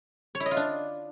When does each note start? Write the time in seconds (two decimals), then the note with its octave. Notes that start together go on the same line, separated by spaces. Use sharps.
0.35 C#5
0.40 E4
0.46 D#5
0.51 F4
0.57 D4